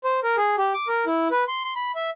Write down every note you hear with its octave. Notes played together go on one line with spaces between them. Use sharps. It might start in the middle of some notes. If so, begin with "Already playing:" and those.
C5
A#4
G#4
G4
D6
A#4
E4
B4
C6
C6
B5
E5